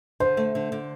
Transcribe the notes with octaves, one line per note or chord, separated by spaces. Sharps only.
D3 C5
A3
D3
D3